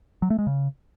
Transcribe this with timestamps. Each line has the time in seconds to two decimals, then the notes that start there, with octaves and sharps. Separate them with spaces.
0.22 F#3
0.30 A3
0.39 G#3
0.47 C#3